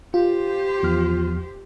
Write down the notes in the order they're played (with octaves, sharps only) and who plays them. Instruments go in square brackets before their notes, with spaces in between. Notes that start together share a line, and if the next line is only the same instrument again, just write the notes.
[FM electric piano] F4 [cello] G4 C5
[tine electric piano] E2 F3 F6